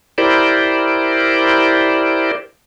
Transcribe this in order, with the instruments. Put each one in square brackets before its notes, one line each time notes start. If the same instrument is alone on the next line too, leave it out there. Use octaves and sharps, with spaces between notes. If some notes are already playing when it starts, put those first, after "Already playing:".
[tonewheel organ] E4 G4 A#4 C5 D5